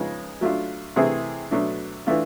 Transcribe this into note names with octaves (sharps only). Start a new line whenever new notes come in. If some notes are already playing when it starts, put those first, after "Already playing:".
Already playing: C#3 F3 G#3 B3 D#4
F#3 A3 D4 F4
C3 E3 A3 C4 E4 G#4
B2 F#3 A3 D4
E3 A3 D4 F4